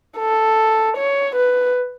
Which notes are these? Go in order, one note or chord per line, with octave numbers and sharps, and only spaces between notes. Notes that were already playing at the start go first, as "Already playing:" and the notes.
A4
C#5
B4